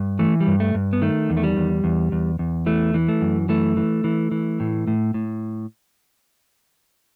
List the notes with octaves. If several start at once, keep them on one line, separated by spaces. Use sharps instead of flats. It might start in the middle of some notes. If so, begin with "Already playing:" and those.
Already playing: G2
E3 A3
G3
G2
A3
G2
B3
D#3 A3
E2
A3
G3
E2
E2
E2
E2
E3 A3
E3
A3
F#2
E3 A3
E3
E3
E3
A2
A2
A2